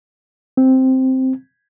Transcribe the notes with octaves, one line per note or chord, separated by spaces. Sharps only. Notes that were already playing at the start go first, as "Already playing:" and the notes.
C4